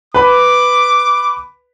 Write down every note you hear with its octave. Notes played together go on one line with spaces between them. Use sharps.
B4 B5 D6